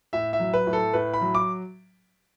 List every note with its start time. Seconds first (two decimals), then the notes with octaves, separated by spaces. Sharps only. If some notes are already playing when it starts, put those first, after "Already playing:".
0.13 A2 E5
0.33 E5
0.40 F#3
0.54 B4
0.67 A2
0.73 A4
0.93 A2 B4
1.14 B5
1.21 F#3
1.35 D6